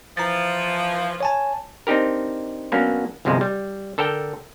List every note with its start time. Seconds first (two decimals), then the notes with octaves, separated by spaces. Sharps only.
0.17 E3 F3 A#5 A6
1.21 C#5 G#5 A5
1.87 C4 D4 D#4 G4 A#4
2.72 F#3 A#3 B3 C#4 D4
3.25 G1 C2 C3 F3 G#3
3.41 G3
3.98 D3 A4 A#4 G5